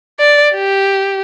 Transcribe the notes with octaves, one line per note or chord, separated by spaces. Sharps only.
D5
G4